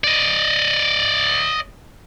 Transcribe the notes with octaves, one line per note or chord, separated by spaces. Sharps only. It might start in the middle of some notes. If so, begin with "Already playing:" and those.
D5 D#5